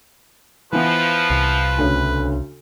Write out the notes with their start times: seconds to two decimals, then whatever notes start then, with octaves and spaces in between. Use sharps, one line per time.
0.73 E3 F3 B3 B4
1.30 C2
1.78 D2 C#3